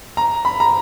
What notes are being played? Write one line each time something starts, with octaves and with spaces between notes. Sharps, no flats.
A#5
B5
A#5